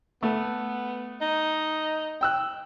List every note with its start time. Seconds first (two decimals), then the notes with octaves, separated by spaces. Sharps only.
0.23 A3 B3
1.21 D#4
2.21 G5 E6 F#6